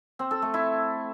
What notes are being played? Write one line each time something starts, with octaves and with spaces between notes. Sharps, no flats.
C4
A4
A3
E4